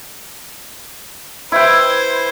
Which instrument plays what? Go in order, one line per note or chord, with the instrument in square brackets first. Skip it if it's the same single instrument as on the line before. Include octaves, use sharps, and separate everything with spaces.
[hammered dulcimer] E4 G5 [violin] B4 C5